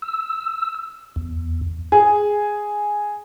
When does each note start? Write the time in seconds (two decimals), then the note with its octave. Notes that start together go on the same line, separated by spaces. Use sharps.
0.02 E6
1.16 E2
1.92 G#4